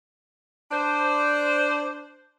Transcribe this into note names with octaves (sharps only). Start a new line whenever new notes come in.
D4 C5